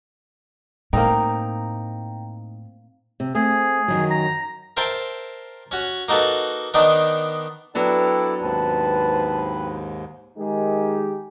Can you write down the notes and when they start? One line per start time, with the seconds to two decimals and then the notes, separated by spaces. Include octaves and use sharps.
0.93 A2 A#3 C4 D#4 G5 A#5
3.20 C3
3.35 A3 C4 G#4
3.88 F#2 D#3 F#3
4.10 A#5
4.77 A#4 C5 E5 G5 A5
5.71 C#4 F#4
6.08 A#3 D#4 F#4 A4 B4
6.74 D#3 B3 D4 D#4
7.75 F#3 B3 D4 E4 A4 D5 G5
8.41 D#2 G#2 C4 B4 A5
10.38 D#3 G#3 D#4 G4 G#4 A#4